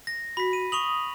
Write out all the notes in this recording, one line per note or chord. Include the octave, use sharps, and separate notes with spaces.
A#6
F#4 B5 B6
D#7
C#6 D#6 F7 F#7